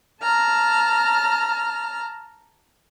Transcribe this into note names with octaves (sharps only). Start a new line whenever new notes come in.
A5 A#5 F6